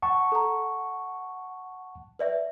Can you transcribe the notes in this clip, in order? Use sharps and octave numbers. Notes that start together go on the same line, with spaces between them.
F#5 A5 C#6
A4 A#5
B4 D5 E5